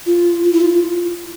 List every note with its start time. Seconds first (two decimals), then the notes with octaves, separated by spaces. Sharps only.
0.06 F4
0.44 F4
0.53 E4
0.60 F4